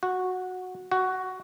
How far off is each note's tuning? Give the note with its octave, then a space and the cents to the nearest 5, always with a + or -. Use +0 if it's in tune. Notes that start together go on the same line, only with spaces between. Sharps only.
F#4 -10
F#4 +10